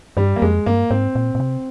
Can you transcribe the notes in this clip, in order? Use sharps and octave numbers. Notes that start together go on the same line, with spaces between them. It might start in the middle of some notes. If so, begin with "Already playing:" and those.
G2 G3
A#3
F2 G#3
G2 A#3
G#2 C4
A#2
A#2
C3